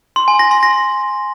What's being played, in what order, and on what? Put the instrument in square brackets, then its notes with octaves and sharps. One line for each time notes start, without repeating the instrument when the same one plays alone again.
[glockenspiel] C6
G#5
A#6
C6
A#6